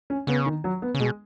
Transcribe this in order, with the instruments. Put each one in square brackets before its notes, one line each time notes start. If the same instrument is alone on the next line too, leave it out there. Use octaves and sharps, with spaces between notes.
[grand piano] C#4
[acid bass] C#3 [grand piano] B3
[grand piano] D#3
F#3
B3
[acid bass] C#3
[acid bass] B2 [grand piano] G#3